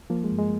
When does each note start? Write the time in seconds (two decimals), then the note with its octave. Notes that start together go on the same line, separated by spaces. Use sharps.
0.10 F3 A#3
0.24 G#3
0.32 G2
0.38 G#3